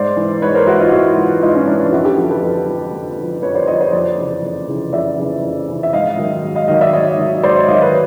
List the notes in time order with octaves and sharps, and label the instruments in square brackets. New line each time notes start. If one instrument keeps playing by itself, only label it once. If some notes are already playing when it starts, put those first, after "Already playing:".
Already playing: [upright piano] G#2 C5 D5
E3
G#2 B4 C#5
A#4 C5
E3 E4 F#4
D#4 F4
G#2 E4 F#4
E3
G#2 D#4 F4
C#4 D#4
E3 D4
D4
F2 E4 F#4
G4 A4
D3 F3
A4 B4
F2
D3 F3
F2
D3 F3
F2 B4 C#5
C5 D5
D3 F3 C#5 D#5
C5 D5
F2 C5 D5
C#3 E3
F2
C#3 E3
F2 D5 E5
C#3 E3
F2
C#3 E3
E5
G#2 D#5 F5
D#3 F#3
G#2
D#5 F5
D#3 F#3 D#5 F5
D5 E5
G#2 C#5 D#5
D#3 F#3
G#2 C5 D5
C#5 D#5
D#3 F#3 D#5 F5
B4 C#5